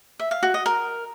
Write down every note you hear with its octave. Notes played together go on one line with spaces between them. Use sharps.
E5
F5
F#4
D#5
A#4